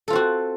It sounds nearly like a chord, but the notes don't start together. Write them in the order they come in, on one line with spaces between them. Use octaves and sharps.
A4 F4 C4 F#4